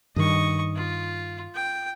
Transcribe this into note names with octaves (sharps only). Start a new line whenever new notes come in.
G2 D#3 D#5 C#6
F4
G5